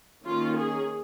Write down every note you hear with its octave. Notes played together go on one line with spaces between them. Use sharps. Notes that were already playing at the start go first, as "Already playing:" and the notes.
D#3 A#3 C#4 F4
G#4